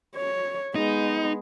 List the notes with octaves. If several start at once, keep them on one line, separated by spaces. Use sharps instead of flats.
C#5
G#3 B3 D#4